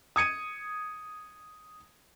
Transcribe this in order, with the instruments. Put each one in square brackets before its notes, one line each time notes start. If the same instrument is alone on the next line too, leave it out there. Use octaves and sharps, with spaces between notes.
[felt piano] D#6 G#6 C#7 D#7